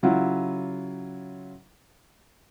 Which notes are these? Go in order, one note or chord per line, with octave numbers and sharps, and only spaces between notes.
C#3 F#3 E4 F4 F#5